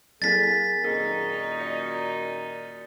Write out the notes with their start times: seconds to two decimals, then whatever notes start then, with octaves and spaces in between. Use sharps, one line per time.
0.22 F#3 A#3 C4 G#4 A4 A6 B6
0.84 F#2 A#2 D#3 D#4 G#4
1.59 D5 C#7